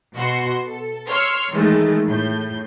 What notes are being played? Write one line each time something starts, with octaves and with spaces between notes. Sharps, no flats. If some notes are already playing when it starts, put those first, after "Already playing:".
B2 F#4 C6
A4
C#5 C6 E6 F6
D#3 E3 G#3 A3
A2 G6